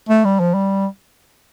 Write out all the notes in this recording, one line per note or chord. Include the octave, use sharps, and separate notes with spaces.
A3
G3
F3
G3